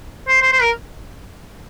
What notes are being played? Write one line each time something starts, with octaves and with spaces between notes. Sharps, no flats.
C5
C5
C5
A#4